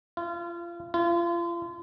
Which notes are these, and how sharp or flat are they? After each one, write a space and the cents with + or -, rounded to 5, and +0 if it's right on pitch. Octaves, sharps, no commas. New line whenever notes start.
F4 -30
F4 -35